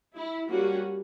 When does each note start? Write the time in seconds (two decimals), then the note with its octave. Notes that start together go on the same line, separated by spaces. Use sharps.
0.14 E4
0.49 G3 A#3 C#4 F#4